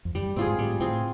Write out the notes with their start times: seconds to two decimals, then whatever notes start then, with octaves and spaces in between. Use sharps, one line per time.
0.05 F2
0.15 F#2 G3
0.26 G2
0.36 G#2 C4 F4 G#4
0.47 G#2
0.59 A2 G3
0.80 A2 C4 F4 G#4